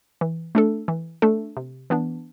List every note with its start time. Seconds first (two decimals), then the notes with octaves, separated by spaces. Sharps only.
0.21 E3
0.55 A3 D4 A4
0.88 E3
1.22 A3 D4 A4
1.57 C3
1.90 E3 B3 D4